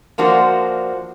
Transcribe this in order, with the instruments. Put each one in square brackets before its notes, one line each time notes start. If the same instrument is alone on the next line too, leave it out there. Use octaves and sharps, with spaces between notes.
[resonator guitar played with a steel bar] F3 A#3 D4 F#4 C5